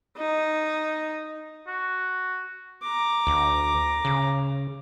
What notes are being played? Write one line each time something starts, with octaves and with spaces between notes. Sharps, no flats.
D#4
F#4
A#5 D6
D2
C#3